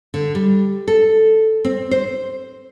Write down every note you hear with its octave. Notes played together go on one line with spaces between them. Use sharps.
D3
G3
A4
C4
C5